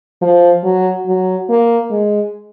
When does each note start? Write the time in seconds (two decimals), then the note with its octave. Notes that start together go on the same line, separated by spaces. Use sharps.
0.21 F3
0.64 F#3
1.07 F#3
1.49 A#3
1.91 G#3